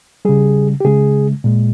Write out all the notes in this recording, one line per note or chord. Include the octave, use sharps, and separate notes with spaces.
C#3 G3 G#4
G4
C#3 G#3 G#4
A#2 G#3